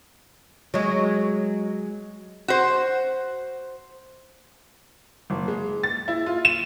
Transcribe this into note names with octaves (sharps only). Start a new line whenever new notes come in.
F#3 G#3
F#4 C5
F#1
G#3
A6
E4
F4
E7